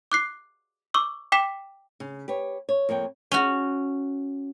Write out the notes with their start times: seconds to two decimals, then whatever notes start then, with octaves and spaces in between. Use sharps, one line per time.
0.12 D6 F#6 C7
0.94 C#6 D6 E6
1.32 G5 D6 B6 E7
2.00 C#3
2.28 G4 B4 C#5
2.69 C#5
2.89 F2 A#3 C#5 G5
3.32 C#4 F#4